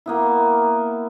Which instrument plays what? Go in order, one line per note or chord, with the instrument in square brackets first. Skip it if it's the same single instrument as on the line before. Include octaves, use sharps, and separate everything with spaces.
[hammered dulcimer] A#3 B3 E4